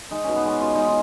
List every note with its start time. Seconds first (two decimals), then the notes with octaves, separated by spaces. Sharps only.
0.11 G#3 D#4
0.24 B2 C#4
0.36 B3
0.45 G#3 C#4
0.61 B2 F4
0.75 G#3 D#4
0.87 F4